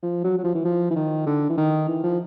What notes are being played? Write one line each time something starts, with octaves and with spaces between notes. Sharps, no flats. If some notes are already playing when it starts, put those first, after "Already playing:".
F3
F#3
F#3
F3
E3
F3
E3
D#3
D3
E3
D#3
E3
F3